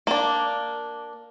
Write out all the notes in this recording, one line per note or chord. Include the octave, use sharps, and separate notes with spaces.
A#3 D4